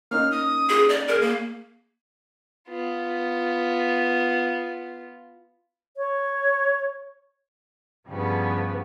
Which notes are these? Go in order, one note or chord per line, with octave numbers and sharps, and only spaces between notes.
A#3 C#4 D#4 F6
D#6
G#4
D5
G#4 A#4
A#3
B3 F4
C#5
G2 C#3 F3 G3 B3